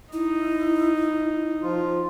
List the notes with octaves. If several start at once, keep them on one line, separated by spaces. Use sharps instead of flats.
D#4 E4
F3 F4